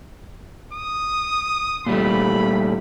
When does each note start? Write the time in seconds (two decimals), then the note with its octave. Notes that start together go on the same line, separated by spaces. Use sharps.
0.73 D#6
1.86 A#2 G3 A3 B5